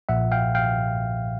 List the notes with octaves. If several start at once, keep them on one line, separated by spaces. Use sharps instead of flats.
B1 A#2 F3 E5 F#5
F5 G5
F5 G5